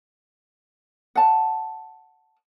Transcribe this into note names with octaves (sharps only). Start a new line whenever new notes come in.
F#5 A5